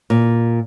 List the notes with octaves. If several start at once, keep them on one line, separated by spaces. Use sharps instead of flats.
A#2